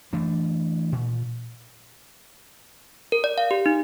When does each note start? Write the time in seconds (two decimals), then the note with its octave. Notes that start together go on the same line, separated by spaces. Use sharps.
0.13 E3 A3 D4
0.92 A#2
3.12 A#4
3.24 D5
3.38 F5
3.51 G4
3.66 D#4